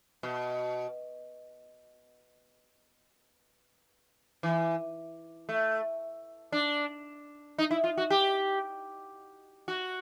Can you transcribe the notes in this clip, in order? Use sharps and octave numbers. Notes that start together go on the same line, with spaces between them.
B2
E3
A3
D4
D#4
E4
F4
F#4
G4
F#4